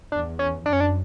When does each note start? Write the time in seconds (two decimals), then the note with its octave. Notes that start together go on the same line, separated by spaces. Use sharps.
0.12 E2 D4
0.39 C#4
0.65 F#2 D4
0.73 C#4
0.80 D4